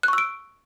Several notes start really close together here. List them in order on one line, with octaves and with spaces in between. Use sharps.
F#6 C#6 E6 D7